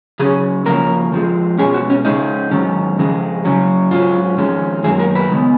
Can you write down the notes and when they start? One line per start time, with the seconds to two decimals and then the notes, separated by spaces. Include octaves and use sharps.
0.20 C#3 F#3 C#4 G#4
0.66 C#3 F3 A#3 C#4 A#4
1.12 F2 F3 G#3
1.58 B2 G#3 C#4 G#4
1.74 F#4
1.90 C#4
2.05 C#3 G#3 C#4 D#4
2.51 G#2 D#3 F#3 C#4
2.98 F2 C#3 G#3
3.45 C#3 F#3 C#4
3.91 G#2 F#3 C#4 F4
4.38 F2 D#3 G#3 C#4
4.84 F#2 D#3 F#3 A#3 G#4
4.99 A#4
5.15 B4
5.30 C#3 G#3 B3